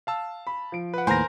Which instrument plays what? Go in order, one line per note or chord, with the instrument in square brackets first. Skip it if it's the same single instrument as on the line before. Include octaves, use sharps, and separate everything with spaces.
[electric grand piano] F5 A5 E6
[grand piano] B5
F3 D7
[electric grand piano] B4 F#5
[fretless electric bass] D#2 A2 [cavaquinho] A#4 C5 [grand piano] G#5 A#6